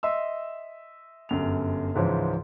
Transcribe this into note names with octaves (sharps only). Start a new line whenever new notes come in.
D#5 E5 C6 E6
G1 F#2 F7
C#2 G#2 E3 F3 C#4